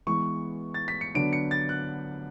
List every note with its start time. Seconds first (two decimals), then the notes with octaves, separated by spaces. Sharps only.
0.07 E3 G#3 B3 C#6
0.74 A6
0.88 B6
1.01 C#7
1.14 D3 F#3 B3 D4 D7
1.33 C#7
1.51 A6
1.69 F#6